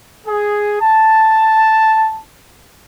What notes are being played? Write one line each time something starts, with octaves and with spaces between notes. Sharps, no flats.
G#4
A5